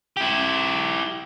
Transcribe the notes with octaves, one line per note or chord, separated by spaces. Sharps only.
E4 G4